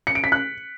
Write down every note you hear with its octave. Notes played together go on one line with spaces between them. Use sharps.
C#7
D7
B6
F#6